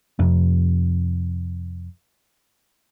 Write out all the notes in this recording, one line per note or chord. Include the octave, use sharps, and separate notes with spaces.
F2 C3